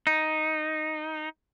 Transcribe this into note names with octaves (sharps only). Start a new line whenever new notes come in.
D#4